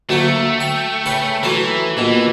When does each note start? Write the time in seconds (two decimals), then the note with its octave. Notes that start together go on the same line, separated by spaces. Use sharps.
0.09 D2 F#3 A3 A#3
0.60 G5
1.06 C#3 B4 G5
1.43 E3 F#3 A3 A#4
1.97 A#1 B2 E3